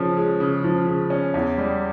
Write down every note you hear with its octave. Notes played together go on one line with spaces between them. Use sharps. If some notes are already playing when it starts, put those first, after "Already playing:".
Already playing: C#3 F3 C#4
G#3
C#3
F3
C#3
C#4
E2
G3